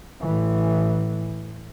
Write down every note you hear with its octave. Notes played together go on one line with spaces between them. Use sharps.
A2 E3